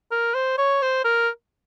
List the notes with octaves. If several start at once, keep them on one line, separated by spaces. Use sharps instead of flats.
A#4
C5
C#5
C5
A#4